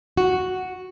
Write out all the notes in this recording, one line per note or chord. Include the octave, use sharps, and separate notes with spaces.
F#4